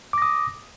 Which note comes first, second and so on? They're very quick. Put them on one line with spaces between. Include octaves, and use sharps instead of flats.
D6 A#6 D#6